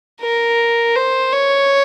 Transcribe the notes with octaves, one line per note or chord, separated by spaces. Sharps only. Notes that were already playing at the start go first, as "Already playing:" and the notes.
A#4
C5
C#5